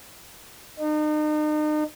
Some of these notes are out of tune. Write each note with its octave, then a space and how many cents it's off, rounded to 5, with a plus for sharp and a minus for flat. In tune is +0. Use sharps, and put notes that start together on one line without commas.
D#4 -40